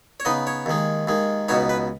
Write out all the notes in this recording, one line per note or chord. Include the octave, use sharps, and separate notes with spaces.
C#5
C#3 B3 D#4 D#5
C#5
D#2 D#3 G#3
D#2 D#3 G#3
C#2 B2 B3 D#4 C#5
B4